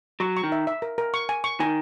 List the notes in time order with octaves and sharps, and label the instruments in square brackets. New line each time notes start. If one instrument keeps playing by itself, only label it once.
[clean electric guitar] F#3 [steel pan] C#6
[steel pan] C#6
[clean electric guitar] D#3
[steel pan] E5
E5
A#4
A#4
C#6
G#5
C#6
[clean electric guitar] D#3 [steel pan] G#5